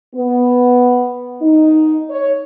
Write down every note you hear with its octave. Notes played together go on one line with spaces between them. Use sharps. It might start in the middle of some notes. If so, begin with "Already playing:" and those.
B3
D#4
C#5